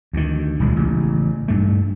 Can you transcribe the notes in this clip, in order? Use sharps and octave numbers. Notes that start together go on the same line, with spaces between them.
D2 D#3
D#1 C#2 G#3
A1 C#3
G2 A3